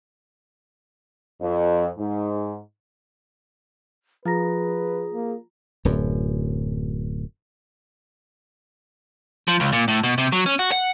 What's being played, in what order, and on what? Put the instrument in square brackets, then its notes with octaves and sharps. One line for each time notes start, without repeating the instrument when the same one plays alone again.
[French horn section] F2
G#2
[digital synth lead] F3 [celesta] F4 A#5 A#6 [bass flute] G#4 [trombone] B4
[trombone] A#3
[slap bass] D1 F#2
[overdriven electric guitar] F3
C#2
A#2
A2
B2
C3
F#3
C#4
F#4
F#5